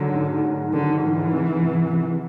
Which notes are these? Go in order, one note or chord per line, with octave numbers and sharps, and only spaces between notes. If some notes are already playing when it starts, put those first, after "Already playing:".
Already playing: G#2 D3 D#3 F#3
G#2
G#2
D3 D#3
G#2 E3
C3
C3
C3